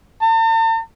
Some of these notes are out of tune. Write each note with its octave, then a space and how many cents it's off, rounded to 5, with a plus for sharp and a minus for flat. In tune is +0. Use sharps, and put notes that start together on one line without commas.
A5 +45